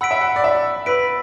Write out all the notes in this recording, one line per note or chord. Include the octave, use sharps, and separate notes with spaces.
F#5 B5 E6 B6 D7
E5
F#5
D5
E5
B4 B5 E6 B6 D7